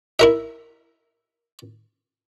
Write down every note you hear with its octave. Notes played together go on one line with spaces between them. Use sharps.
E4 A#4 E5